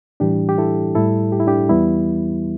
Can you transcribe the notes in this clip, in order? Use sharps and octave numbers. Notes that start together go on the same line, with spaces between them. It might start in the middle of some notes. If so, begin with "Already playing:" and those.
A2 E3 G3 D4 G4
G4
E4 A4
A2 G3 E4 A4
G4
E4
D4 G4
E2 E3 G3 B3 E4